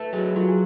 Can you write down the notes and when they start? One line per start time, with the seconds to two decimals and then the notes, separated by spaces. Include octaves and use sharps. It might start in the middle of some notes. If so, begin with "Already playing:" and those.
Already playing: A3 A4 B4
0.13 F#3 G#4
0.35 F#3 F4
0.48 G#4